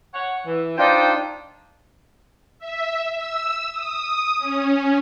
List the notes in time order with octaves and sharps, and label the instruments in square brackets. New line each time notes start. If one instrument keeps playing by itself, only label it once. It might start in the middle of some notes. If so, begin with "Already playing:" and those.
[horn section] C#5 F#5
E3
[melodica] D4 F4 [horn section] D#4 C5 G5
[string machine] E5
E6
D#6
C#4